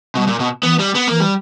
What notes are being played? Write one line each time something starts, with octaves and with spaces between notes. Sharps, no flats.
B2 G3
A#2
B2
E3 B3
G3
B3
E3 A#3
G3